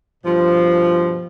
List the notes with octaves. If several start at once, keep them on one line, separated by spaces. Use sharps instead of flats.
G2 B2 F3